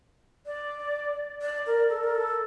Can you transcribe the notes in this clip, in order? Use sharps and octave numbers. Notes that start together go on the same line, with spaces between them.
D5
D5
A#4
A4
A#4
A4